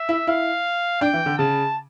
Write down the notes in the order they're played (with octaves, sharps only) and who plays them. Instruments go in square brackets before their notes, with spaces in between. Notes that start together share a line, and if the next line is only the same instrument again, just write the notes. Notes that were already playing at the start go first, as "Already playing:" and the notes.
Already playing: [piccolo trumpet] E5
[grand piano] E4
[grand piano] E4 [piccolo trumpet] F5
[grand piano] D4 [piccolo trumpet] G5
[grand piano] E3
D3
[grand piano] C#3 [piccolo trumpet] A5